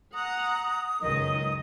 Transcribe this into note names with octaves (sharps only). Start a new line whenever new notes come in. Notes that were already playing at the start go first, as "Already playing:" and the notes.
F#5 A#5 D#6
C#2 F#2 D#3 D#5